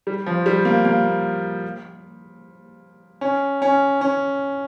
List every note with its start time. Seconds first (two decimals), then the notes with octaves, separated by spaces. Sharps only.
0.07 G3
0.26 F3
0.46 G3
0.65 A#3
0.85 A#3
3.21 C#4
3.62 C#4
4.01 C#4